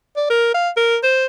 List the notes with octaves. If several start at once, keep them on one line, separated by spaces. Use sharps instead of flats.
D5
A#4
F5
A#4
C5